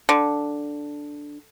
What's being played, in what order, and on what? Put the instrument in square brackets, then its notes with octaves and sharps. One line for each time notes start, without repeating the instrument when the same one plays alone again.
[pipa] D3